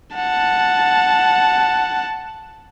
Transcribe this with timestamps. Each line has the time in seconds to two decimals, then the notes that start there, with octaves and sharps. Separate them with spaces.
0.15 F#5 A5